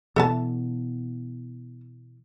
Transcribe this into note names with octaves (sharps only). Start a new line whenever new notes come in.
B2 E3 B3 A4 E5 A5